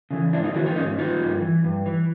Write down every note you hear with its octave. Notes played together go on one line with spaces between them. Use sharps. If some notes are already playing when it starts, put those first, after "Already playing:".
C#3 E3
G#2 D4 E4
D#4 F4
D#3 E4 F#4
D#4 F4
G#2 C#4 D#4
D#3 D#4 F4
G2
E3
G2
E3